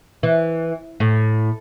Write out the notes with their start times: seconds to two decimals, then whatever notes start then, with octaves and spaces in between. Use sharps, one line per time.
0.23 E3
1.00 A2